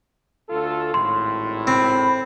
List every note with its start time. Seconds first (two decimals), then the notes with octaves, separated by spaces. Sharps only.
0.49 D2 F4 A4
0.94 G#1 A2 C6
1.67 C4 B5